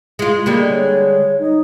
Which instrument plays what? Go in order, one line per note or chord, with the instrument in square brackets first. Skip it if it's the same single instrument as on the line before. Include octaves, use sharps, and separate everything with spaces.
[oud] G#3 F4
[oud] D3 G3 G#3 [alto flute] A#3
[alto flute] C#5
D#4